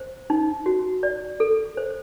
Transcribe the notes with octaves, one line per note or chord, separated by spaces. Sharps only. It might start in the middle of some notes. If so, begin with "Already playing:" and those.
Already playing: C5
D#4
F#4
D5
A4
C5